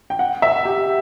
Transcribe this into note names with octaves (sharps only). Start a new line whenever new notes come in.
G5
F#5
E5
G4